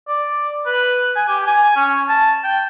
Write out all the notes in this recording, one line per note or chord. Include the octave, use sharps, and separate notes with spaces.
D5
B4
G#5
G4
G#5
C#4
A5
G5